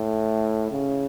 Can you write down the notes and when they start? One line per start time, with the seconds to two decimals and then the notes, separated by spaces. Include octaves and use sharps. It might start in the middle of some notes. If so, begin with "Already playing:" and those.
Already playing: A2
0.71 C#3